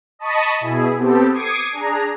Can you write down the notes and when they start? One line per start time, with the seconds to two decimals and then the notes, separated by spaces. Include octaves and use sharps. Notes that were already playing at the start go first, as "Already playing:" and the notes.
0.19 D#5 A5 B5 C#6 D#6
0.61 B2 E4 G#4
0.95 B3 C4 G4 A4
1.32 D6 D#6 G#6 C7 C#7
1.72 D4 G#4 A#5